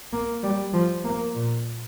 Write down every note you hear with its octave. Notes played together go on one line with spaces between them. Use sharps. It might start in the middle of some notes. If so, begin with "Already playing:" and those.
A#3
G3
F3
A#3
A#2